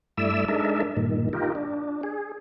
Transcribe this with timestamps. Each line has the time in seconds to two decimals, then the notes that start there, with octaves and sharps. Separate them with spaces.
0.17 G2 A3 E4 D5 E5 E6
0.48 G#3 D4 D#4 A4 A#4 E5
0.97 G2 A#2 D#3
1.33 D#4 F4 G4 A#4
1.55 D4
2.03 G#4